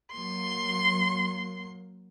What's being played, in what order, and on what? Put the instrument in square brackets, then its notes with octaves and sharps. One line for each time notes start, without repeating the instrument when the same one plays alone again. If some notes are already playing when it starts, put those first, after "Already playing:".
[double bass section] F#3 A#3 [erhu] C6